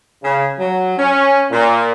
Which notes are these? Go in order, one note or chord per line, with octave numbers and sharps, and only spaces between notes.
C#3
F#3
C#4
A#2